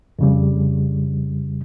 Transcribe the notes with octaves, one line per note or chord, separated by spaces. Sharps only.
F2 C#3 G3